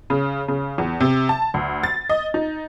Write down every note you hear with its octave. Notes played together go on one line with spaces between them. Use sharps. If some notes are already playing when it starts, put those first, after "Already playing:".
C#3
C#3
E2
C3
A5
D2
A6
D#5
D#4